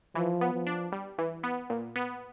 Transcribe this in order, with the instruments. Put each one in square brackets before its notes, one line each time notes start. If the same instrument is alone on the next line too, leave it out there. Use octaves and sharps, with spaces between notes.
[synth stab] E3 [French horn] F3
[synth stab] B3
[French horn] F3
[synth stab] D4
G3
E3
B3
A#2
B3